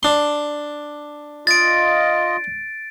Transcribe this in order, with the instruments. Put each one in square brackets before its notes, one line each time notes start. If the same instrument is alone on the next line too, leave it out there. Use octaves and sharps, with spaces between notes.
[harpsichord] D4 C6
[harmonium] F4 D#5 [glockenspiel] A6 D7